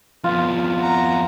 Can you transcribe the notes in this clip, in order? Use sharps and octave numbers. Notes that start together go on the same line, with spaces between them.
F2 B3 F4
F#5 A#5